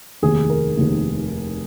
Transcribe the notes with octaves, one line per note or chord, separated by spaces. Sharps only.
F1 D#2 D#3 G#4
A#4
F1 D#2 D#3